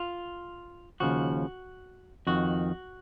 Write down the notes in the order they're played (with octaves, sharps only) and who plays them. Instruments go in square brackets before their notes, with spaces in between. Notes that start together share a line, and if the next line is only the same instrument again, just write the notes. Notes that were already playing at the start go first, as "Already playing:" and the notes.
Already playing: [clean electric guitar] F4
D#2 C#3 F3 F#4
F2 D#3 F#4